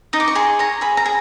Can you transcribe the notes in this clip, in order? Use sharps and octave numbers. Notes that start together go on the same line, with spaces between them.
D#4 D#6
D6
C#6
G#4 C6
C#5 A#5
G#4 B5
A#5
G#4